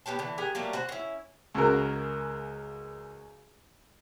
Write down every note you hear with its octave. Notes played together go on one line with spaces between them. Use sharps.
B3 G4 C#5 A5
D3 E3
G4 G#4 A#4 F#5
F#3 G3 A3 A#3
F#4 C5 F#5
C#4 E4
C#2 C#3 F#4 A#4